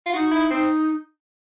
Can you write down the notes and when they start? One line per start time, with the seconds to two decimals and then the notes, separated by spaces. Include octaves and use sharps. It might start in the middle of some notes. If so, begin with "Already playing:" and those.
0.06 F4
0.13 D#4 F#4
0.31 E4
0.51 C4 D#4